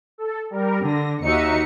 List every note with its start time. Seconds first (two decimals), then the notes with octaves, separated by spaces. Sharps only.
0.18 A4
0.50 G3 A#4
0.83 D3 A#6
1.24 D#2 D#4 F#4 E5 C#7